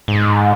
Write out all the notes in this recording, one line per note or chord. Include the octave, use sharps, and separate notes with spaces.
G#2